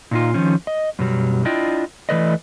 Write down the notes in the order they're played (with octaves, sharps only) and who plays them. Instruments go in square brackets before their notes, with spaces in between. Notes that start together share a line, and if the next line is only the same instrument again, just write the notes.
[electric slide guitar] A#2 D#4 F4
D#3 F3 C#4
D#5
F#2 B2 F#3 G3
D4 E4 F4 D#5 G5
E3 F3 A3 B4 D5 D#5